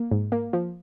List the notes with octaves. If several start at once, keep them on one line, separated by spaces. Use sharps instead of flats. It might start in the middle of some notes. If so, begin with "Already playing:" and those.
Already playing: A#3
G#2
A#3
F3